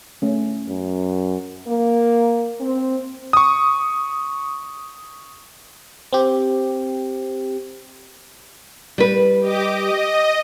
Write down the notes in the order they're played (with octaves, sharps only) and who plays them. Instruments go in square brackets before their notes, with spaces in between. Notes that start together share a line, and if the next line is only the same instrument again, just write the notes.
[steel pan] A3 C#4
[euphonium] F#2
[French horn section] A#3
C4
[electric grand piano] C#6 D#6
[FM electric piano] C4 G4
[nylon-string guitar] G3 B4
[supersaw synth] G4 D#5 D6
D#5